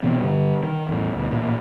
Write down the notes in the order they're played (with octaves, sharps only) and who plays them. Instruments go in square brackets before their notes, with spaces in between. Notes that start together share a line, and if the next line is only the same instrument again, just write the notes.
[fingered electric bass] B2 E3 B3 C4
G2 D3
D#3
E2 A2
D2 B2
A1 A#2